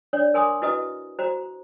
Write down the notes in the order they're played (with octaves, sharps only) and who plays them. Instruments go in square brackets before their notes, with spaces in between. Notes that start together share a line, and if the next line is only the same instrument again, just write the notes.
[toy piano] D4 C#5 D5
A#4 G#5 C6 D6 D#6
E4 F#4 B4 D#5 D#6
F#4 C5 A#5